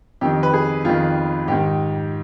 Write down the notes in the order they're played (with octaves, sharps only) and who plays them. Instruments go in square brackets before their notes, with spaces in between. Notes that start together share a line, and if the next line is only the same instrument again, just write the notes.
[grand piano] F2 D#3 G4
B4
G#4
F2 D#3 F4
G#2 D#3 G4